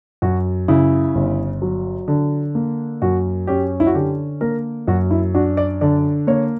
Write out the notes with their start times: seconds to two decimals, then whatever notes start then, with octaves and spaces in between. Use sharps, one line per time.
0.22 F#2 F#4
0.68 C#3 E4
1.15 G1
1.62 F#3
2.08 D3
2.55 A#3
3.02 F#2 F#4
3.47 C#4 G4
3.80 E4
3.87 F#4
3.94 D3 G4
4.41 A#3 A#4
4.88 F#2 F#4
5.11 E4
5.34 D4 F#4
5.57 D5
5.81 D3 D5
6.27 A#3 C#5